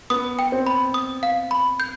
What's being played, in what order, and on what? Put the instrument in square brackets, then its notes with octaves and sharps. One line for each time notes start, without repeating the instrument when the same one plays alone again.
[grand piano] B3 [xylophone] D#6
[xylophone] G5
[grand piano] C4
[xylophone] B5
D#6
F5
B5
G6